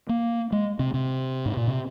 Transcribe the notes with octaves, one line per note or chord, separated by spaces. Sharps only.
A#3
G#3
C3
C3
G#2
A#2
C3